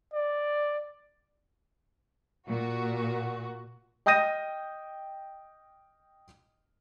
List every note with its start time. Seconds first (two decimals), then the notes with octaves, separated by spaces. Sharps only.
0.14 D5
2.47 A#2 F#4
4.06 D#5 G5 D#6 G6 A#6 D#7